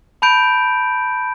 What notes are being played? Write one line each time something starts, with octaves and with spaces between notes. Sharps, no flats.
A5 B5 G6 D7